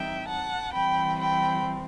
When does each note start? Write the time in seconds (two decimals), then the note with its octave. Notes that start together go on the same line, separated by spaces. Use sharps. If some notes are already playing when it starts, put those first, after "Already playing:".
Already playing: E3 G3 C4 D#4 E5 G5
0.27 F#5 A5
0.72 E3 G3 C4 G5 B5
1.18 G5 B5